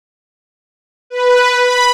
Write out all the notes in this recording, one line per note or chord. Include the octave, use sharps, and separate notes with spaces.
B4
B5